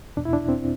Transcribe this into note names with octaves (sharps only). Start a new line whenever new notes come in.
E2 B2 D4
E4
D4
C4